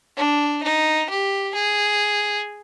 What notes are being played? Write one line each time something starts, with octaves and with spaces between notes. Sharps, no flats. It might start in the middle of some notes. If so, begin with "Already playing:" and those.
D4
D#4
G4
G#4